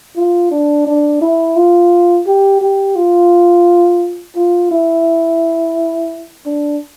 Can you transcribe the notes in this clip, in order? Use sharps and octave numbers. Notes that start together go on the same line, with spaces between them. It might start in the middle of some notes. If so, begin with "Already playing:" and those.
F4
D4
D4
E4
F4
G4
G4
F4
F4
E4
D4